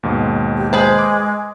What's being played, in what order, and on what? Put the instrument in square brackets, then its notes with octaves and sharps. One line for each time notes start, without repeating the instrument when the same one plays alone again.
[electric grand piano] D#2 G#2 B2
[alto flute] G4
[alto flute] G#3 [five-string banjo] G#4 B4 C5
[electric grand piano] D6